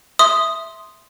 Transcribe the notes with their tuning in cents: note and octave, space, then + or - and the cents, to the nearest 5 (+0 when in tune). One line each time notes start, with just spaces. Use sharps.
E5 +0 C6 +0 D#6 +0